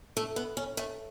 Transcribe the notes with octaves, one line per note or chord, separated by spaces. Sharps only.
A3
B3
C#4
A3